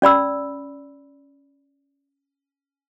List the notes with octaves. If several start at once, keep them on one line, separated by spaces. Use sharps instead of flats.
C#4 D5 B5 E6